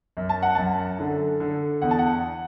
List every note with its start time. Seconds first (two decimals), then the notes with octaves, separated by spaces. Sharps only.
0.17 F#2
0.29 A5
0.42 F#5
0.55 F#2 A5
0.99 D3
1.40 D3
1.82 E2 F#5
1.91 A5
1.99 F#5